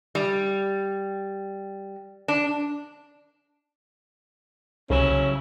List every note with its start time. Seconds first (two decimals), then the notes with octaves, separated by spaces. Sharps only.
0.15 G3
2.28 D4
4.90 C2 C#3 F#3 C#4 E4